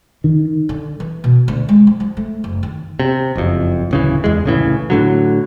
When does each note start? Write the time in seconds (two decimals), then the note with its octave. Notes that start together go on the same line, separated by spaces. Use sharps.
0.24 D#3
0.69 D3
1.00 E3
1.24 B2
1.48 D2
1.69 G#3
1.87 F3
2.00 F3
2.17 A3
2.44 F#1
2.63 D#3
3.00 C3
3.36 F#1 F2
3.91 D1 C#3 E3
4.24 E2 G#3
4.44 C2 A2 C#3 E3
4.90 A2 D3 F#3